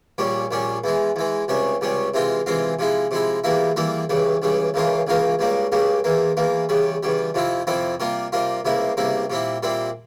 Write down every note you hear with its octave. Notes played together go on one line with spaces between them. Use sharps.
A#1 A#2 G3 C#4
A#1 A#2 G3 C#4
E2 E3 G#3
E2 E3 G#3
C#2 C3 G3 C#4
C#2 C3 G3 C#4
C3 E3 G#3 C4 F4
C3 E3 G#3 C4 F4
C3 F3 G#3 E4
C3 F3 G#3 E4
E2 E3 G3 A#3 E4
E2 E3 G3 A#3 E4
C#2 C#3 E3 G3
C#2 C#3 E3 G3
C#2 C#3 E3 A#3 F4
C#2 C#3 E3 A#3 F4
C#2 C#3 G3 A#3
C#2 C#3 G3 A#3
E2 E3 A#3
E2 E3 A#3
E2 C#3 G3
E2 C#3 G3
F2 C3 F3 C4 E4
F2 C3 F3 C4 E4
C3 G3 A#3 F4
C3 G3 A#3 F4
C#2 C3 G3 A#3 E4
C#2 C3 G3 A#3 E4
A#2 G3 C4 E4
A#2 G3 C4 E4